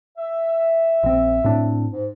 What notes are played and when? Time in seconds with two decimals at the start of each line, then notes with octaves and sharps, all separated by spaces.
0.18 E5
1.03 A#1 C4
1.44 A2 C4 D4
1.91 G#2